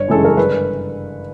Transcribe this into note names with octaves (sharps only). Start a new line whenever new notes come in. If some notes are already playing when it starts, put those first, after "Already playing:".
Already playing: G1 C#5
F#2 C#3 E3 G#3 A4
A#4
G1 B4